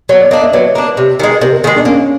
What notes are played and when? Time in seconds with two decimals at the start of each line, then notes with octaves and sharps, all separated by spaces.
0.09 F#3 C#5
0.21 D5
0.31 A#3 D4 D#5
0.42 E5
0.53 F#3 B4
0.75 A#3 D4
0.97 C3
1.20 D#3 G#3
1.41 C3 A#4
1.52 A#4
1.64 D#3 G#3 G#4
1.75 D4
1.85 A#3 C#4